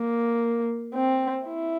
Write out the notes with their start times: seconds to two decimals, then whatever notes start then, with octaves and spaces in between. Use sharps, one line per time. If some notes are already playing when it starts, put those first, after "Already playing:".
Already playing: A#3
0.94 C4
1.45 E4